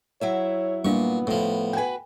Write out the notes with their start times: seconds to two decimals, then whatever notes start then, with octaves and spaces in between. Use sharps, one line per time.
0.21 F#3 E4 C#5 E5
0.85 A#2 G3 B3 D4 C#6
1.27 A2 F3
1.73 F#4 B4 G5 G#5